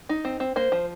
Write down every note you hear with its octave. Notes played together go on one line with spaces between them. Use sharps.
D#4
C4
C4
A#3 C5
F3